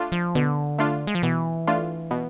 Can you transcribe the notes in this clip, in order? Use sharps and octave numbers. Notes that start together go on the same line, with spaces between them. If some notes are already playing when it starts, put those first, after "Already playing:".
Already playing: A3 D4 F4
F3
B2 D3
A3 D4 F4
G#3
F3
B2 E3
A3 D4 F4
B2